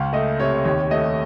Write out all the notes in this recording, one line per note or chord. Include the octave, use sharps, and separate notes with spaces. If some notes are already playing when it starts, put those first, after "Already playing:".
Already playing: C#2 F5
A3 D#5
C3 C#5
D#2 C#5
A3 D#5